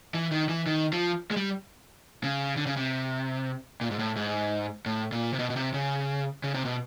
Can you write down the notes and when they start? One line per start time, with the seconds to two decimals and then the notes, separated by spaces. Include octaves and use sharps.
0.14 E3
0.31 D#3
0.49 E3
0.67 D#3
0.93 F3
1.31 G#3
1.36 G3
2.24 C#3
2.57 D3
2.66 C#3
2.76 C3
3.81 A#2
3.91 G#2
3.99 A2
4.16 G#2
4.86 A2
5.12 A#2
5.33 C3
5.39 B2
5.50 B2
5.56 C3
5.74 C#3
6.44 C#3
6.54 C3
6.65 B2